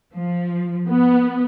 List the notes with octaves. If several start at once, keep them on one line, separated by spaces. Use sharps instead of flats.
F3
B3